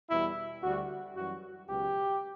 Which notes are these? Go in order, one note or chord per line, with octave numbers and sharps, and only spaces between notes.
E2 B2 G3 E4
D2 D3 G3 F#4
F#2 E3 G3 F#4
C#2 B2 F#3 G4